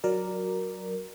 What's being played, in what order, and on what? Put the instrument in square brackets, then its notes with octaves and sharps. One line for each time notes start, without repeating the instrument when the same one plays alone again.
[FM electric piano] F#3 A#4 D5